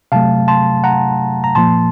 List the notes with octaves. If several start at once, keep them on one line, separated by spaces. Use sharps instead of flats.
C3 F#3 A3 F5 A5
A5 C6
F#5 A#5
A#5
A#2 F3 A#3 A5 C6